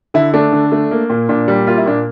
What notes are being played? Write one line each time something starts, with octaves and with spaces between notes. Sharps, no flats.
D3 E4
A3 D4
D3
A3
A#3
A#2
A#2 D4
G3
A#3 F4
E4
A#2 D4